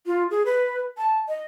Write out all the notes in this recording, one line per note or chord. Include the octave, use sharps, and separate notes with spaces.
F4
G#4
B4
A5
D#5